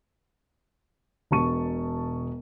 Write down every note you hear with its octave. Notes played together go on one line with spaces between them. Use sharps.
E1 B2 A5 C#6 D#7